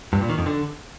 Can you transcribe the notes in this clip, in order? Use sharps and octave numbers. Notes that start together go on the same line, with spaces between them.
G2
A#2
D#3
F2
D3